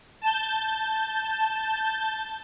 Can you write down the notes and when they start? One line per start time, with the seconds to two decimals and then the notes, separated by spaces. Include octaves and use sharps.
0.22 A5 G6